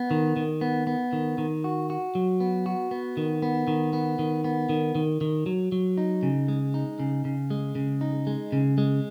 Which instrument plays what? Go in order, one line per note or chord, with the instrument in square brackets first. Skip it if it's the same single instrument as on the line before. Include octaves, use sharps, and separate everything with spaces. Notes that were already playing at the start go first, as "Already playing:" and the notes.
Already playing: [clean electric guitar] B3
D#3
D#3
B3
B3
D#3
D#3
F#4
F#4
F#3
B3
F#4
B3
D#3
B3
D#3
B3
D#3
B3
D#3
D#3
D#3
F#3
F#3
D#4
C#3
G#3
D#4
C#3
C#3
G#3
C#3
D#4
G#3
C#3
G#3